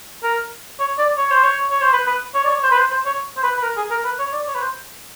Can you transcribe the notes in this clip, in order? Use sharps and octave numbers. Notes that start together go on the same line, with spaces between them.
A#4
C#5
D5
C#5
C5
C#5
C#5
C5
B4
B4
C#5
D5
C#5
C5
B4
C5
C5
C#5
C5
B4
B4
A#4
G#4
A#4
B4
C#5
D5
C#5
B4
C5